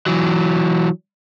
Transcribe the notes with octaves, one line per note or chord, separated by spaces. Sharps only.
E3 F#3